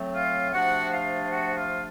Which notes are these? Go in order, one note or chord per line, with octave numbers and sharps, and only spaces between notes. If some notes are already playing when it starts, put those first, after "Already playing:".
Already playing: A2 F#3 A3 C4
F4 F5
C3 F3 A3 D4 F#4 F#5
F4 F5
F#4 F#5
F4 F5